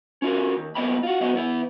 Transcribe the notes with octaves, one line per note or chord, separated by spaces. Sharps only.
C#4 F4 F#4 A#4
D#2
F3 A#3 B3 D#5 G5 B5
F4 F#4
F#2 B3 F#4 D#5 E5
E3 B3 E4